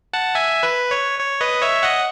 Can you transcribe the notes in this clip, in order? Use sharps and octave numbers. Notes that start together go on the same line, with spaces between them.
F#5 A5
E5 G#5
B4
C#5
C#5
B4 D#5
C#5 E5
D#5 F#5